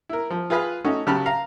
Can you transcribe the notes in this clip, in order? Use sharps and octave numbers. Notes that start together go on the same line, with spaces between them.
E4 A#4
F3
F4 G#4 B4 B5 F6
A3 C#4 D#4 F#4
C#3 F#3 G4 A5 B5 F6
F5 A#5